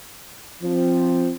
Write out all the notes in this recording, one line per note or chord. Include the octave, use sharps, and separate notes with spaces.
F3 C4